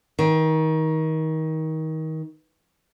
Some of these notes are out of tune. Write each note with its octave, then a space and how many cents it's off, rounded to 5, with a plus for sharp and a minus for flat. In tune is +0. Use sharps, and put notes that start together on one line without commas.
D#3 +25